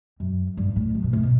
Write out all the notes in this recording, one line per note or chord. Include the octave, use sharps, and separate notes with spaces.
F#2
G2
A2
F#2
B2
A2
B2